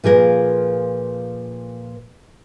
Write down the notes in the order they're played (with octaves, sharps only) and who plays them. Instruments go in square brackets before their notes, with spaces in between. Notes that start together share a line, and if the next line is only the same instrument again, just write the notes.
[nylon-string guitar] A#2 F3 G#4 A#4 B4